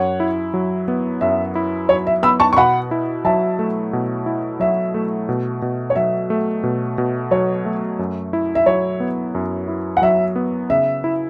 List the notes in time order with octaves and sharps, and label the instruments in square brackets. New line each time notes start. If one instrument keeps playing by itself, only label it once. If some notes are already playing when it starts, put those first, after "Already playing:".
Already playing: [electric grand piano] F#2 [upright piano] C#5 F#5
[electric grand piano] E4
F#3
B3
[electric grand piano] F#2 [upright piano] E5
[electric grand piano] E4
[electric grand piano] F#3 [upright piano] C#5
[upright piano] E5
[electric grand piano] B3 [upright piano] B5 E6
[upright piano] A5 C#6
C#6
[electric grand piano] B2 [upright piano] F#5 B5
[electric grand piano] E4
[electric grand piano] F#3 [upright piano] E5 A5
[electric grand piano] A3
B2
E4
[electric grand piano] F#3 [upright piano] E5
[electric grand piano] A3
B2
B2
[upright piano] C#5
[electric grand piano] F#3 [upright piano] E5
[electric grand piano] A3
B2
B2
[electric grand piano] F#3 [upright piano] C#5
[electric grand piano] A3
F#2
E4
[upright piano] E5
[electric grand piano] F#3 [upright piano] C#5
[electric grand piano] B3
F#2
E4
[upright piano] F#5
[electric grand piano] F#3 [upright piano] E5
[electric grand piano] B3
[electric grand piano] C#3 [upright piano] E5
[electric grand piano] E4